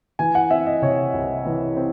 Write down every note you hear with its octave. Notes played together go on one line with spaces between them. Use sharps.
E3 G#5
F#5
C4 E5
D#5
C3 C#5
C2
E3
C4